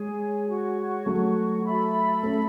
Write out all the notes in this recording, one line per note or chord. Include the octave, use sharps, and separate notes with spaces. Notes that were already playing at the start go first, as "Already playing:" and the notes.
Already playing: G#3 G#4 C#5 G#5
F#4 C#5 F#5 C#6
F#3 A3
A4 E5 B5
A3 C#4